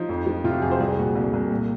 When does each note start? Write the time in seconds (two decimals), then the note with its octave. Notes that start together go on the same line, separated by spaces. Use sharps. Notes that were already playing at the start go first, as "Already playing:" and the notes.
Already playing: F3 D#4
0.09 F2
0.26 F3
0.44 C3 F4
0.54 F#4
0.62 F2 G#4
0.71 C5
0.80 C2 G#4
0.98 A#2 F#4
1.15 C2
1.33 C2
1.51 A#2